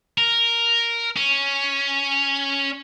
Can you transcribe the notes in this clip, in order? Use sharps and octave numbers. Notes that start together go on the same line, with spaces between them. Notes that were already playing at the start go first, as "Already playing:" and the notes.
A#4
C#4